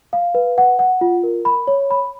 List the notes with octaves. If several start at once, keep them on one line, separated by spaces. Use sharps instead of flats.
F5
B4
F#5
F#5
F4
A#4
B5
C#5
B5